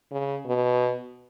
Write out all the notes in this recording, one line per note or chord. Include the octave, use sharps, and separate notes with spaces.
C#3
B2